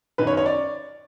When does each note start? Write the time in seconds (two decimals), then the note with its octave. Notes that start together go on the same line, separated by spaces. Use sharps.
0.18 F#2 D#3 B4
0.27 C#5
0.37 C#5
0.46 D5